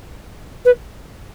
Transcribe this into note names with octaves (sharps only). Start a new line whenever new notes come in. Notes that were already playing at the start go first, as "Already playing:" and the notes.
B4